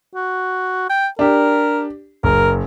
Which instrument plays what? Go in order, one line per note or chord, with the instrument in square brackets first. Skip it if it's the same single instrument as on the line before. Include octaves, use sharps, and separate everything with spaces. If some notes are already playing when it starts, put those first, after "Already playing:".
[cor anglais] F#4
G5
[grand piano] D4 G4 [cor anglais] A#4
[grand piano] F#1 [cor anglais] A#4